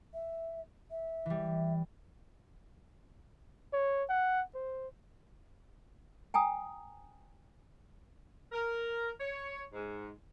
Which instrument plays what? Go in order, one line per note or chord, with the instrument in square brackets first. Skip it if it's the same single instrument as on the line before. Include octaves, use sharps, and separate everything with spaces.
[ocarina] E5
E5
[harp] E3 G3
[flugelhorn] C#5
F#5
C5
[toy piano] G5 G#5 A#5 D#6
[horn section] A#4
C#5
G#2